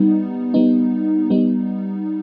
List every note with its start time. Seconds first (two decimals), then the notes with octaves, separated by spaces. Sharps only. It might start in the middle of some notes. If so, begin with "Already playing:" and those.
Already playing: G3 B3 D#4
0.54 G3 B3 D#4
1.30 G3 B3 D#4